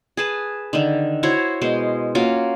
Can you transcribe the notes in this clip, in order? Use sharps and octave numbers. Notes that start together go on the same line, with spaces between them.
G#4 B4 A5
D3 D#3
E4 F#4 C5 C#5
B2 G#3 C5
A#3 C#4 F4 F#4